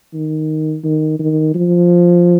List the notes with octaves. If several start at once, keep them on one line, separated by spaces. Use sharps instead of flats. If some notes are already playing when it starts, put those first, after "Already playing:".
D#3
D#3
D#3
F3